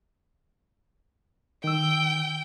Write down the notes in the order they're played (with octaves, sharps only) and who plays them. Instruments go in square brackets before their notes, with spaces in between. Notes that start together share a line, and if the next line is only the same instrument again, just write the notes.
[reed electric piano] D#3 E6 [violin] G5